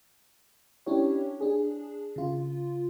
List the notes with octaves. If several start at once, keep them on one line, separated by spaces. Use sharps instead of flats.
C#4 D4 E4 G4 C#5
D4 G#4
C#3 F4